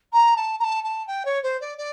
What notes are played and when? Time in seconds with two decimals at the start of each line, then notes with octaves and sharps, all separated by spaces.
0.13 A#5
0.36 A5
0.59 A#5
0.64 A5
0.84 A5
1.07 G5
1.25 C#5
1.43 C5
1.61 D5
1.78 D5